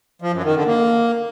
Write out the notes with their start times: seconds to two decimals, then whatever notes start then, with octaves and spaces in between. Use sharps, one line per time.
0.22 F3
0.33 F#2
0.44 D#3
0.55 D3
0.66 A#3